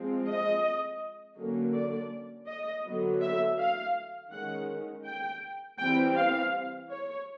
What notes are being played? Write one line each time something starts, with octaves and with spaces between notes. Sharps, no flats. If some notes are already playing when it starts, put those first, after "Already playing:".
Already playing: F3 G#3 C4
D#5
D3 F#3 A#3 C#4
D5
D#5
D3 F#3 B3
E5
F5
D#3 G#3 C#4 F#5
G5
E3 G3 C4 G5
F5
C#5